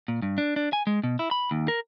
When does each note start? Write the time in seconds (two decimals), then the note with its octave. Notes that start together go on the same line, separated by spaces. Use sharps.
0.08 A#2
0.22 G2
0.38 D4
0.56 D4
0.73 G#5
0.87 G#3
1.04 B2
1.19 E4
1.31 B5
1.51 D#2
1.68 A#4